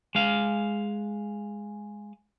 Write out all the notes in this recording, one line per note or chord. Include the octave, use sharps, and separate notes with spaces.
G#3 F5